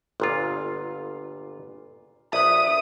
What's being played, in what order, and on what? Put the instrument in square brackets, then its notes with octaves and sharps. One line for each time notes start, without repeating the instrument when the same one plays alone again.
[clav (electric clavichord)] G1 A#2 F4
[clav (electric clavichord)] A#1 B4 [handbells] E5 [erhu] D#6